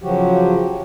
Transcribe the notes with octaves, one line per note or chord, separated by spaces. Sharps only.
C#3 F3 F#3 F#4 G4